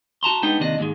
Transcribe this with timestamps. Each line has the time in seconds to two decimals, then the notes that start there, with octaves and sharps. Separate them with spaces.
0.23 F#4 A5 A#5 C6
0.43 G#3 B3 D4 D#4 G5
0.60 D#2 C3 D4 D#5
0.79 D#2 G#2 G#3